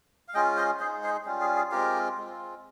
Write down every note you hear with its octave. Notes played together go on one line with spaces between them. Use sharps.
F5
G#3 C#4 F4 D#5 G5
C5 D#5
G#3 D#4 G#4 C5
G#4 C5
G3 C#4 F4
G#4
G#4
G#3 C4 F4 G4 A#4
G#3 C4 F4